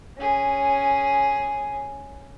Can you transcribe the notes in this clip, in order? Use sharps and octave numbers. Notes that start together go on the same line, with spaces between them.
C#4 G#4